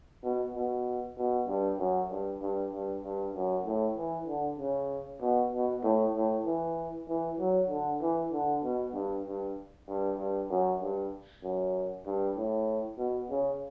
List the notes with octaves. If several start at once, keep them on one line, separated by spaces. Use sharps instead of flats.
B2
B2
B2
G2
F#2
G2
G2
G2
G2
F#2
A2
E3
D3
C#3
B2
B2
A2
A2
E3
E3
F#3
D3
E3
D3
B2
G2
G2
G2
G2
F#2
G2
F#2
G2
A2
B2
C#3